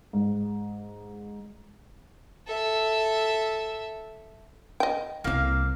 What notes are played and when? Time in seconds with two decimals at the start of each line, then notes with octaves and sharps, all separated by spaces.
0.13 G#2
2.47 A4 E5
4.80 D#5 G5
5.24 C2 A#3 C4 F5